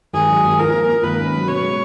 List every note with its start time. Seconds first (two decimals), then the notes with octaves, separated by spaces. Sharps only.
0.13 G#1 G#4
0.28 F#3
0.44 G#1
0.59 F3 A#4
0.73 A#3
0.88 A#3
1.03 G#1 B4
1.19 C#4
1.33 F#3
1.48 B2 C#5
1.63 G#3